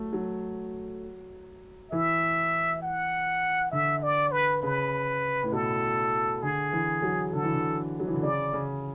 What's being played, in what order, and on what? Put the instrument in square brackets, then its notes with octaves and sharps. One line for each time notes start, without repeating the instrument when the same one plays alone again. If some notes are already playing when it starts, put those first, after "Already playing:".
Already playing: [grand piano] F#3 A3
F#3
[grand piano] E3 [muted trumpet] E5
[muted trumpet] F#5
[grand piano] D3 [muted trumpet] E5
[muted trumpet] D5
B4
[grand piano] C#3 [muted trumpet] B4
[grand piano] A2
[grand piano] B2 [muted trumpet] A4
[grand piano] D3 [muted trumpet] G#4
[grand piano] E3
F#3
[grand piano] D3 [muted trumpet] A4
[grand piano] E3
D3
F#3
E3
D3
[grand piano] C#3 [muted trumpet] D5
[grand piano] C#3